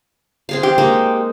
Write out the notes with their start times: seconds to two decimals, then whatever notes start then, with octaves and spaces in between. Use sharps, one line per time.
0.49 C4 G#4 F5
0.63 G4
0.78 G#3 A#3 D#4